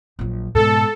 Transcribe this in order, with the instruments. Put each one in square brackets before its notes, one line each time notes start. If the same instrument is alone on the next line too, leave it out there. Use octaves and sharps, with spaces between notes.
[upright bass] A#1 F#3
[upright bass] G#2 B2 [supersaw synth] A4